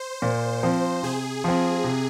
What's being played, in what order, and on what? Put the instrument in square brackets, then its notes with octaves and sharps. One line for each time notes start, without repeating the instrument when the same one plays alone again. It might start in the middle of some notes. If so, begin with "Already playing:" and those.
Already playing: [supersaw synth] C5
[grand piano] A#2
F3 C4
[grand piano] C3 [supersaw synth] G#4
[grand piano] F3 C4
C3